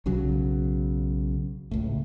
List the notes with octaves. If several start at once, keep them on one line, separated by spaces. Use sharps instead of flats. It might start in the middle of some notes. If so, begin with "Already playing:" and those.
B1 C#3 F#3
C#2 A2